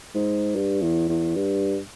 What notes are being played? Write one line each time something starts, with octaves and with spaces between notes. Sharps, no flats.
G#2
G2
E2
E2
G2